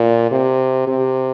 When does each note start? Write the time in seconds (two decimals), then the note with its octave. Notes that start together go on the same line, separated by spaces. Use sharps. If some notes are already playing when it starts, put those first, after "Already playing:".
Already playing: A#2
0.31 C3
0.87 C3